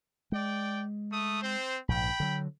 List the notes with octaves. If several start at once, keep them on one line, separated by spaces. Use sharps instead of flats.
G#3 D5 G5
A3 D#6
C4 C5
A#1 G#2 G5 B5
D3 F#3